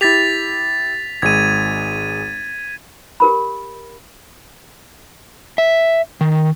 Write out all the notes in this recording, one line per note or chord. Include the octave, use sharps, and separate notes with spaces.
E4 G4 A6 B6 F7
G#1 G#3 G#6 D#7
G4 A#4 B5
E5
D#3